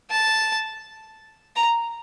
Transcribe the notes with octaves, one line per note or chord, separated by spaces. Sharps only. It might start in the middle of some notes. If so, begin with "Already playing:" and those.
A5
A#5